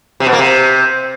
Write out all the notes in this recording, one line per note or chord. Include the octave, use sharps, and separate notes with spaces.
C3
B2
A#3
C3